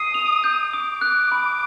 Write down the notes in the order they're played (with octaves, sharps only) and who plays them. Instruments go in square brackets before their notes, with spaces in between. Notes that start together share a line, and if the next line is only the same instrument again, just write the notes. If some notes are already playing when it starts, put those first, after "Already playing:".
Already playing: [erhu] D#6 [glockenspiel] C7
[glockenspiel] F7
G6
[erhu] D6 [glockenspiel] D#6
[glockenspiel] F#6
B5